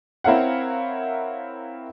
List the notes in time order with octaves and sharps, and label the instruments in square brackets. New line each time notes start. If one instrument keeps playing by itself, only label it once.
[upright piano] C4 E4 A#4 C#5 F5 F#5